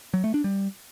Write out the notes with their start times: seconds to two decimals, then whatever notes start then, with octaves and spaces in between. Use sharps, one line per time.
0.14 F#3
0.24 A3
0.34 D4
0.44 G3